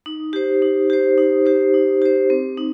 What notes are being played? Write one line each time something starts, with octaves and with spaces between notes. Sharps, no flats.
D#4
G4 C5
D#4
G4 C5
D#4
G4 C5
D#4
G4 C5
C4
D#4